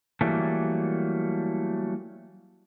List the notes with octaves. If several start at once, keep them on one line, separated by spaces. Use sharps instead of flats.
E3 F#3 G3 A3 A#3